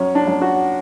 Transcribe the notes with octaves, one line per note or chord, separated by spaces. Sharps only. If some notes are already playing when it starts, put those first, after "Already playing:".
Already playing: F#2 C#4
D4
F#2
F#4